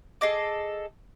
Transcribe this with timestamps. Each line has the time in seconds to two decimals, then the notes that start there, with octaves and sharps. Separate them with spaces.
0.21 G#4 A4 D#5 D6